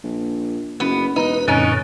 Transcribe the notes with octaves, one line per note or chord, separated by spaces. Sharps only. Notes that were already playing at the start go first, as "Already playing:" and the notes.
A#1
F#1 B3
E1 D#4 B4
C2 F#2 A#2 D3 C#4 D#4